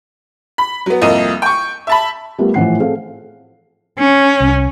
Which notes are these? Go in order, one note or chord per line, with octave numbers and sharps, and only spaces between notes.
B5
F#3 B3
C2 F2 A#3 D#5 D#7
G5 C#6
E5 A5 B5
G3 A3 B3 F4 A#4
A2 E3 F3 F#5 C7
C4 G#4 A4 F5
C#4
C2